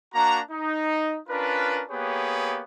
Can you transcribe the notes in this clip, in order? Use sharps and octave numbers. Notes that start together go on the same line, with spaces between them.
A#3 D4 F#4 A#5
D#4
C#4 D4 F4 A#4 B4
A#3 B3 G4 G#4 B4 C#5